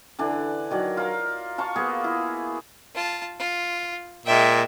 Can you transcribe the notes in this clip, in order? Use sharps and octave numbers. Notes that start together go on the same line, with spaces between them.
D3 E3 D4
D#3 F#3 D5
F4 A#4
F4 A5 C#6
A#3 B3 G#4
E4
F4 A5
F4
A#2 G#3 E5 G5